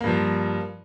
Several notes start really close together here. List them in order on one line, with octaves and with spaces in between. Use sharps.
A#3 G2 F3